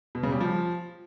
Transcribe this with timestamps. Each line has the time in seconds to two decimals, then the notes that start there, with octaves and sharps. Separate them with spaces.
0.15 B2
0.23 C#3
0.32 G3
0.40 F3